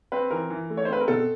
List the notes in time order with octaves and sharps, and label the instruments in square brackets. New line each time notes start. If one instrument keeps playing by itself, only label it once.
[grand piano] C4 B4
E3 A#4
E3
A3
C#5
C5
C4 B4
A#4
B2 A4